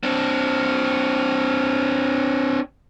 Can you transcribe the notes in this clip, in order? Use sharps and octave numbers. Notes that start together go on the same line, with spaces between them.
C4 D4